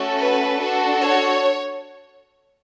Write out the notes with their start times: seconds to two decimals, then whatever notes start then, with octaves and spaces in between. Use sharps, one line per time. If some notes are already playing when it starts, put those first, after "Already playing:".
Already playing: A3 C#4 F#4 A4
0.19 B4
0.60 D4 F#4 A4
1.01 C#5